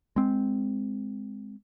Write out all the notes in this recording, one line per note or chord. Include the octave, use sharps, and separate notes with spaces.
G#3 C4